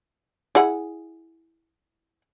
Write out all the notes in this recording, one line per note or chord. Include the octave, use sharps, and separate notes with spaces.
E4 G#4 F#5